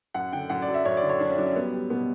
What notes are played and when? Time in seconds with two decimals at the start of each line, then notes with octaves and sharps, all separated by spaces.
0.14 F#2 F#5
0.33 D3 G5
0.50 F#2 F#5
0.62 D5
0.68 F#3
0.74 E5
0.85 F#2 C#5
0.97 D5
1.02 D3
1.09 C#5
1.20 F#2 D4
1.30 C#4
1.38 F#3 D4
1.46 C#4
1.55 G3 B3
1.73 G3
1.90 B2 B3